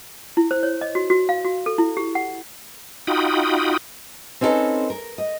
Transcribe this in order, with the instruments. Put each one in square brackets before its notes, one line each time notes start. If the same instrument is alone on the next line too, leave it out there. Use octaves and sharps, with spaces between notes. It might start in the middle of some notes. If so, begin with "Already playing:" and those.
[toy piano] E4
C5
C#5
D#5
F#4
F#4
F5
F#4
A4
E4
G4
F#5
[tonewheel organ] D#4 F4 F#4 G5 B5 D#6
[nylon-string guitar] C4 C#4 D#4 F4 A4 B4
A#4
D#5